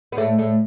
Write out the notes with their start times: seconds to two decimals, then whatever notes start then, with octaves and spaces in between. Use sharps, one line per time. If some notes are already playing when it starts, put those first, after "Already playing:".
0.12 B3
0.17 A2 A3
0.38 A2 A3